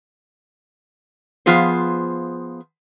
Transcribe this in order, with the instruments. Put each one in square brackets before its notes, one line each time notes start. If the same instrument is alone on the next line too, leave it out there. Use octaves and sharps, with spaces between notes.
[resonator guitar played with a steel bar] F3 B3 F4 G#4 C5